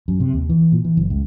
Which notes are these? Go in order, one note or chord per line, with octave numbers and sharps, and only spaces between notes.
F#2
C3
D#2
E3
A#2
E3
F#1
C#2